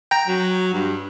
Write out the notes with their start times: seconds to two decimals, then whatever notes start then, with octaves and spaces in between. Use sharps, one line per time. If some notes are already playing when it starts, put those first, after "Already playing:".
0.11 G5 A#5
0.27 F#3
0.73 G2